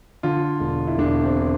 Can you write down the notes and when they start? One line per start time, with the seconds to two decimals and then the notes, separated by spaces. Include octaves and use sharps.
0.23 D3 F4
0.60 E1
0.87 E4
0.98 E1 D4
1.24 C4